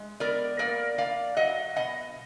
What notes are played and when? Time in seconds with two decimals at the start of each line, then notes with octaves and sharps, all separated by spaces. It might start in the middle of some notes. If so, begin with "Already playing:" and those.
Already playing: G#3
0.20 B3 A#4 D5
0.59 A#3 A#4 D5
0.98 A#3 D5 F5
1.37 F#3 D#5 F#5
1.76 B2 D#5 F#5